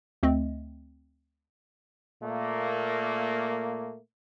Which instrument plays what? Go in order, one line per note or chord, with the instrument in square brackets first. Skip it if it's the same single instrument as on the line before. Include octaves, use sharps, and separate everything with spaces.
[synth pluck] D2 A3 C4 D#5
[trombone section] A#2 A3 A#3